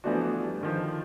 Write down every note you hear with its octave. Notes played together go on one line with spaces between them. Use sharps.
E3 F3 A3 B3 D4 F#4
G3
D3 D#3 F3